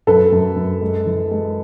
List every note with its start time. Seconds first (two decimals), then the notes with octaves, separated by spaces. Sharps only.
0.07 F#2 A4 B4
0.32 F#2
0.56 F#2
0.81 G#3
1.06 E3
1.31 G#3